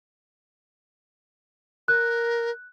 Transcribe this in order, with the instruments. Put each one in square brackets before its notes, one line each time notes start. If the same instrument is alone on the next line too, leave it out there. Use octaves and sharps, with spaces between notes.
[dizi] A#4 [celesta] F#6